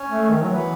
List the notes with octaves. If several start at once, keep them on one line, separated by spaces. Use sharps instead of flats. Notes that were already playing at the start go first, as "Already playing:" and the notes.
Already playing: C#4
A3
D#3
F#3
E3 B3